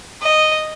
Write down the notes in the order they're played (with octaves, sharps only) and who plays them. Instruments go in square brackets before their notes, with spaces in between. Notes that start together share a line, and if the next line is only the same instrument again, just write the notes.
[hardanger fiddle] D#5